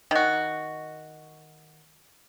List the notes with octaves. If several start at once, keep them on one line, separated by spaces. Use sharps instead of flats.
D#3 F#4